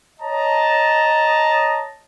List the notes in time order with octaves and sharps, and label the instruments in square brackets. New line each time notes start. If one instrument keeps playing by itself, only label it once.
[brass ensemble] C#5 D#5 A5 A#5